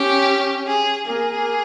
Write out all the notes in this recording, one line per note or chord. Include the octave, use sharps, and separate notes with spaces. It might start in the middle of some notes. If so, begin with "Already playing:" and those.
Already playing: C#4 G4
G#4
A#3 G#4